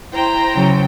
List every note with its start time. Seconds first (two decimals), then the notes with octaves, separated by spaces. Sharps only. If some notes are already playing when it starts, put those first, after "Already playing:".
0.13 E4 C5 G5 A#5
0.53 C#3 F#3